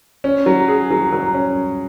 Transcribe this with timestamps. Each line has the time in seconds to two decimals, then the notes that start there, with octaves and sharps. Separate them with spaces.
0.24 C#4
0.46 F#3
0.68 G#4
0.91 F#3
1.12 F#3
1.34 C#4